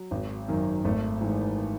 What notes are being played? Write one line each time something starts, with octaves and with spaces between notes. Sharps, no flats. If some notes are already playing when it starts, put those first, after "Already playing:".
Already playing: F#3
G#1
F#2 D#3
G#1 A3
G#2 E3